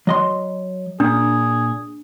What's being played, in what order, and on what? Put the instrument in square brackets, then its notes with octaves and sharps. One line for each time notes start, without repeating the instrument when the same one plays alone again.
[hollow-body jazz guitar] F#3 D#5 C6
[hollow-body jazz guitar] A#2 [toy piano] D4 [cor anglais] G#4